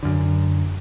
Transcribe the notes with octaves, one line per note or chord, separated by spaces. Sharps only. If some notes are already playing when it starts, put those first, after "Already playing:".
F#2 D3